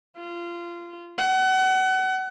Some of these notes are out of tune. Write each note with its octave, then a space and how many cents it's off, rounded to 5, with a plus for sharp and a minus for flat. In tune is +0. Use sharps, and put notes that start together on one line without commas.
F4 -20
F#5 +30